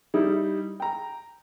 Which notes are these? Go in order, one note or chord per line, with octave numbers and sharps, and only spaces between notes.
G3 D#4 E4
G5 A#5